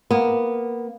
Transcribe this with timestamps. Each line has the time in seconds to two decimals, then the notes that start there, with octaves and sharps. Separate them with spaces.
0.11 A#3 B3